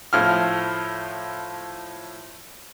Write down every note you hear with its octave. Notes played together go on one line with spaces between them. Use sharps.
A2 F3 F6